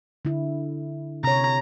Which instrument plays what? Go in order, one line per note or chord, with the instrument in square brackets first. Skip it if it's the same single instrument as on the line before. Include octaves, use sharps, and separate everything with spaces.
[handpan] D3 E4
[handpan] C3 C#5 [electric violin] A#5